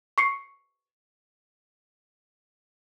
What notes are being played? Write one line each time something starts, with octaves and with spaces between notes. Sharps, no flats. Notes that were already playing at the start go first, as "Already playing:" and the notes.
C#6 C7 C#7